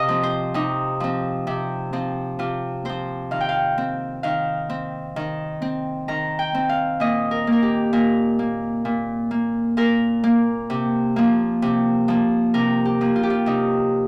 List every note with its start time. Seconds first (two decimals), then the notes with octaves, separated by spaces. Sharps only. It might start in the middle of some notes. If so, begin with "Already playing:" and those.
Already playing: C3 D#5 F5
0.08 F3 C4
0.23 C5
0.54 C3 D#4
1.00 F3 C4
1.47 C3
1.93 F3 C4
2.39 C3 F4
2.85 F3 C4 C5
3.31 D#3 F5
3.40 G5
3.49 F5
3.78 C4
4.23 D#3 F5
4.70 C4
5.16 D#3
5.62 C4
6.08 D#3 A#5
6.39 G5
6.54 C4
6.69 F5
7.00 A#2 D#5
7.31 A#4
7.47 A#3
7.52 A#4
7.62 G4
7.93 A#2 A#4
8.39 A#3
8.85 A#2
9.31 A#3
9.77 A#2 A#4
10.24 A#3
10.70 C3
11.16 F3 A#3
11.62 C3
12.08 F3 A#3
12.54 C3 A#4
12.85 G4
13.01 F3 A#3
13.16 F4
13.23 G4
13.30 F4
13.46 C3 D#4